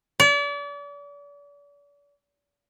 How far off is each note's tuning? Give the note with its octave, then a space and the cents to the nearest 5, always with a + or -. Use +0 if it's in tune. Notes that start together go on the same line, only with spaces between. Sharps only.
D5 -40